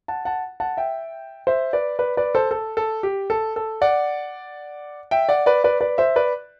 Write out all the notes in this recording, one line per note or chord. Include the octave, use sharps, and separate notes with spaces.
F#5 A5
F#5 A5
F#5 A5
E5 G5
C5 E5
B4 D5
B4 D5
B4 D5
A4 C5
A4
A4
G4
A4
A4
D5 F#5
E5 G5
D5 F#5
B4 D5
B4 D5
B4 D5
C5 E5
B4 D5